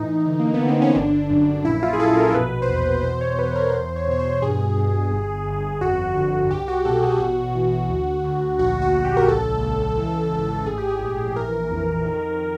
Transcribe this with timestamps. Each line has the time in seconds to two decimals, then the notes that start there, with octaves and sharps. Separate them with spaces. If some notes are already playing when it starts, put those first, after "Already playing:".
Already playing: A2 E3 D#4
0.26 D3
0.40 A#3
0.54 B3
0.61 D3
0.68 C4
0.82 C#4
0.96 G1 D4
1.30 F#2
1.65 A#1 E4
1.83 F4
1.93 G#4
1.99 A#1 A4
2.17 A#4
2.34 B2 B4
2.62 C5
2.69 E2 B4
3.03 E2 C5
3.21 C#5
3.39 E2 B4
3.56 A#4
3.73 E2 C5
3.96 C#5
4.08 B2 C#5
4.19 C5
4.42 G2 G#4
4.77 G2
5.11 G1
5.47 G1
5.81 F2 F#4
6.16 D3 F#4
6.51 C2 G4
6.68 F#4
6.85 B2 A4
7.02 G#4
7.20 A1 F#4
7.55 E3
7.89 D2
8.24 D2
8.59 A#1 F#4
8.82 F#4
8.93 A#1
9.05 G4
9.17 A#4
9.28 C#2 A4
9.63 C#2
9.97 E3
10.32 G#1
10.66 A2 G#4
10.78 G4
10.88 G#4
11.01 A#1
11.36 E3 A#4
11.71 F2
12.06 D#3